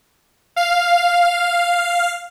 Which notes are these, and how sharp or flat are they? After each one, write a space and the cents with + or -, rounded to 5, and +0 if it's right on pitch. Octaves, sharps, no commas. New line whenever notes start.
F5 +0